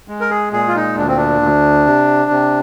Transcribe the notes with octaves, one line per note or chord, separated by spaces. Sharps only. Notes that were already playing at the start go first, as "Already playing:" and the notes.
G#3
A#4
G#4
A#2 G#4
F4
D#4
D2 D4
C4
D4
D2
C3
C3